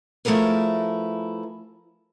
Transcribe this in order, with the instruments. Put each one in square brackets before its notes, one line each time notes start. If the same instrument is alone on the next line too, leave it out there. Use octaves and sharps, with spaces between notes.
[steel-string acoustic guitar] F3 A3 E4 G#4 A#4 B4